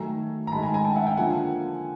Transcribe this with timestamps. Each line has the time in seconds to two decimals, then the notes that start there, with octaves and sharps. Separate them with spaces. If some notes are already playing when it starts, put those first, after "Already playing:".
Already playing: D#3 F#3 A3 G#5 A#5
0.47 A#5
0.52 D#3 G#3 A5 B5
0.63 G#5 A#5
0.74 G#5 A#5
0.85 G5 A5
0.96 E5 F#5
1.07 F5 G5
1.17 D3 F3 A#3 F#5 G#5